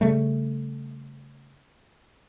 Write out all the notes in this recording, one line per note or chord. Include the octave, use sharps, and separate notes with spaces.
C#3 G3 A3